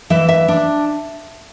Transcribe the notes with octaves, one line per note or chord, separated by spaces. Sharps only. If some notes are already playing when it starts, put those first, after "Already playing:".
E3 E5
E5
D4